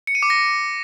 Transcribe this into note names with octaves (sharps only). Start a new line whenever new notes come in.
C#7
D#7
D6
A#6